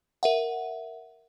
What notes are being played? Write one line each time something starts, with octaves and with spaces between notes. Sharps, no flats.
A#4 E5 F#5